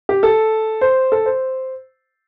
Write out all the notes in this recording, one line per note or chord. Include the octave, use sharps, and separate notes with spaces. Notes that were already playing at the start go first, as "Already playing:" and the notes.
G4
A4
C5
A4
C5